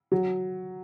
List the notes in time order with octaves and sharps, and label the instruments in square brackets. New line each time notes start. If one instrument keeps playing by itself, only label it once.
[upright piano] F#3